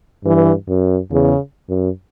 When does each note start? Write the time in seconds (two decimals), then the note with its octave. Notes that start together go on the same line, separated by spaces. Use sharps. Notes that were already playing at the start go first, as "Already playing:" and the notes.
0.24 G2 E3
0.68 F#2
1.12 E2 C#3
1.69 F#2